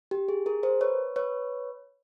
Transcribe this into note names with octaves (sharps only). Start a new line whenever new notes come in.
G4
G#4
G#4 A#4
A#4 C5
B4 C#5
B4 C#5